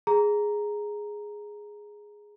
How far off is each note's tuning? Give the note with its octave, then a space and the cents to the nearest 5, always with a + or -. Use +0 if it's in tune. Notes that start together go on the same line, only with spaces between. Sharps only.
G#4 +0 A#5 +0